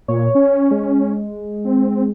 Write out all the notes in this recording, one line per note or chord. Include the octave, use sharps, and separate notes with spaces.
A#2 C#5
C#4 C#5
G#3
C4